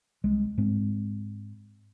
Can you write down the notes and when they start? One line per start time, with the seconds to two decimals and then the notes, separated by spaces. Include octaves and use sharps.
0.24 C2 G#3
0.58 G#2 G#3 C4